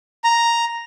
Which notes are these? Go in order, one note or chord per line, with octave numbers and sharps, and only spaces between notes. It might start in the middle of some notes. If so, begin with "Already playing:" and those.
A#5